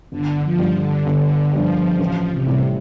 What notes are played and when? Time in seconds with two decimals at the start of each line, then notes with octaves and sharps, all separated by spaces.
0.12 G1 D3
0.44 F3
0.59 G2 G3
0.75 D3
1.06 G1 D3
1.53 G2 F3 G3
1.99 A1 F3
2.31 C3
2.47 A2 G3